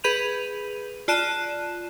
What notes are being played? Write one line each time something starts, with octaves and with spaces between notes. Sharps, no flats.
G#4 B4 B5 G6 D#7 F7
F4 D5 A5 F#6 D#7 E7